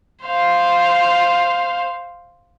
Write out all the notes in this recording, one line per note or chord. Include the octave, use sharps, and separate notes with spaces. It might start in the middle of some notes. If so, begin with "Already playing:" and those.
C5 F5